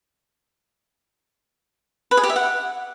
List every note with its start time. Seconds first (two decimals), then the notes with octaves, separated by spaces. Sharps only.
2.11 B4
2.17 G#4
2.23 G4
2.30 E5
2.36 F#5